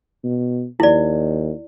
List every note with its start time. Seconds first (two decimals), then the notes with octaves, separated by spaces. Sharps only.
0.24 B2
0.80 D#2 E4 D5